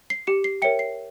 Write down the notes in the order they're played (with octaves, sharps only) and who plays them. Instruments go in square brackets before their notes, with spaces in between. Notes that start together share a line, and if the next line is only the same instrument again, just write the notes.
[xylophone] C7
G4 C#7
C7
A#4 C#5 E5 G5 C#7
C7